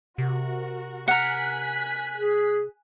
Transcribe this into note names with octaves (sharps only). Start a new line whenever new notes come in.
C3 F#4 A#4
A#4 F#5 G#5 F#6 B6
G#4